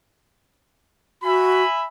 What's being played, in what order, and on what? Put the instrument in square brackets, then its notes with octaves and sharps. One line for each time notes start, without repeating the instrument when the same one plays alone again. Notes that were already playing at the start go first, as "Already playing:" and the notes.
[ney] F#4 [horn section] E5 G#5 B5